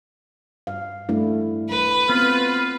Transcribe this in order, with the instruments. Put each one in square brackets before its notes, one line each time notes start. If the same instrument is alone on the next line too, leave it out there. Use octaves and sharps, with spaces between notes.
[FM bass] G2 [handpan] F5
[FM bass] G2 [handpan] A3 D4 E4
[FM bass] D#1 [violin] B4
[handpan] B3 [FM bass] C4 [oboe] F4